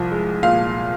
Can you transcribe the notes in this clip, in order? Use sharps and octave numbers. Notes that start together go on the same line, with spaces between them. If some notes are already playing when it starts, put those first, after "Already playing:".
Already playing: C2 F3
G#3
A#2 F5